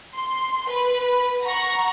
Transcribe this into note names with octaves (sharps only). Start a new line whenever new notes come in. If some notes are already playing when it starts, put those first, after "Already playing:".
C6
B4
F#5 A#5 C#6